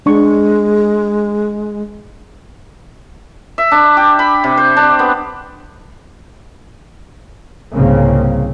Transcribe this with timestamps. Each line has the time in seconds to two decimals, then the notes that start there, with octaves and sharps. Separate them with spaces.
0.06 G#3 D4 C#6
3.58 E5
3.71 D4
3.97 G4
4.19 B5
4.44 C3
4.57 C5
4.77 D4
4.99 B3
7.74 C2 G#2 C#3 A#3 C4